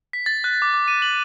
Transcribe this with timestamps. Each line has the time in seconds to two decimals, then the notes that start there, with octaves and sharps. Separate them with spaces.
0.13 B6
0.26 A6
0.44 F#6
0.62 D6
0.74 D6
0.88 D#7
1.02 F#7